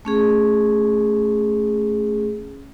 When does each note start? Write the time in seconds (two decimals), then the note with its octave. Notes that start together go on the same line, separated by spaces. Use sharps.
0.05 A3 C#4 G#4